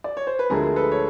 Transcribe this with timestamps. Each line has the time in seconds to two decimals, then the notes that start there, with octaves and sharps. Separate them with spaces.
0.04 D5
0.17 C#5
0.27 C5
0.39 B4
0.50 D2 D3 F3 G#3 G#4 A#4
0.76 A4 B4
0.92 C#5